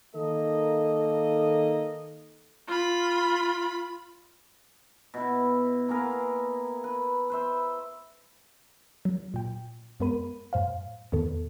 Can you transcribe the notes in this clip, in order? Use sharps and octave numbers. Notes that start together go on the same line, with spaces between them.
D#3 A#3 A4 D#5
F4 B5
B2 E4
A#3 B3 G#4 A#4
B4
B4 C5 E5
F#3
A#2 G5
F#2 G#3 B3 A#4 B5 D#7
F#2 A2 C5 F5
E2 A2 D#3 B3 A4